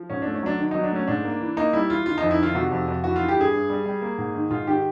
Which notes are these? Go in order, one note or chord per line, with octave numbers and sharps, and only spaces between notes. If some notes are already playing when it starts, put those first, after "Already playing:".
Already playing: F3
G#2 C#4
A3 D4
C#4
F#3 D4
D#3
F#3 D#4
D4
A3 C#4
G#2 D4
A#3
E3
A#3 D#4
G3 E4
E3 F4
D#3 F4
F2 D#4
E4
D#3 F4
C3 F#4
F2
F2
E3 F#4
E3 F4
G4
G2 G#4
G2
G3
G3
A#3
G#2
D#3
G#2 F4
D#3 G4